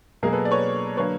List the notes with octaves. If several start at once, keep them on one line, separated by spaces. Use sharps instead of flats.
B2 F#3 A#3 G#4 A#4
A4 B4
D5
B4 C#5
D3 F#3 A#3 B4 C#5